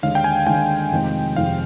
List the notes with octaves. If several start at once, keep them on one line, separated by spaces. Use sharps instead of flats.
D#2 D3 G#3 F5
G5
G#5
D#2 D3 G#3 G5
F1 F2 C3 D#3 G#3
F1 F2 C3 D#3 G#3 F5